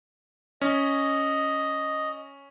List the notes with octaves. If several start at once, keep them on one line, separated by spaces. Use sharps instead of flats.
C#4 D#5